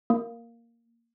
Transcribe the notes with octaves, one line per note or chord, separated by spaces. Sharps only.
A#3